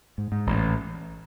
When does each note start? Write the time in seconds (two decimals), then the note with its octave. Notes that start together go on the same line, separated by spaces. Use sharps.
0.18 G#2
0.32 G#2
0.47 A1